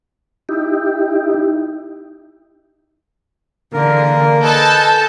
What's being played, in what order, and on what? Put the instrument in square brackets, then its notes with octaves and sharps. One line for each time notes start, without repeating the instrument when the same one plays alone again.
[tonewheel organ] D#4 E4 G4
[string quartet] D3 E3 G#4 [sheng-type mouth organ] A#3 A#4
[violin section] A4 A5 [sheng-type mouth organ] B4 D#5 G#5 [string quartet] G6